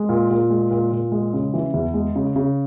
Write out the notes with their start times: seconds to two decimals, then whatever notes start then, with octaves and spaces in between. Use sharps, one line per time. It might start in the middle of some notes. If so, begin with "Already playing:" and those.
Already playing: G#3
0.09 A#2
0.30 A#2
0.50 G#3
0.71 A#2
0.92 A#2
1.12 G#3
1.33 C#3
1.54 E3
1.74 E2
1.94 G#3
2.16 C#3
2.36 C#3